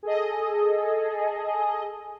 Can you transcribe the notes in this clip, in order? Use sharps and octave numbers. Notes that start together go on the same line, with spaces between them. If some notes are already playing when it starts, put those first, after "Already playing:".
G#4 A4 D#5